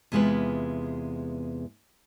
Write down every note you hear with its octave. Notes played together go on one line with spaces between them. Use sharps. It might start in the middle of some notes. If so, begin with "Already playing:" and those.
E2 C3 G#3 B3 F4 B4